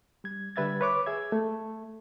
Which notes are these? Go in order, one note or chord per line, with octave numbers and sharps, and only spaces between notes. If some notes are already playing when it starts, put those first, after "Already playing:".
G3 G#6
D3 G3 B4 E5 G#6 A6
B4 C#5 D6
G#4 E5 G#6
A3